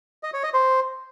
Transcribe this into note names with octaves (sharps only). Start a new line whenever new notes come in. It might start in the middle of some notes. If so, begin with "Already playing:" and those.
D#5
C#5
D#5
C5